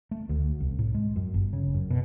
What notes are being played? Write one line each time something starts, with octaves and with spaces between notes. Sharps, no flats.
A3
D2
C2
A2
G#3
F#2
G1
C#3
F#2
B2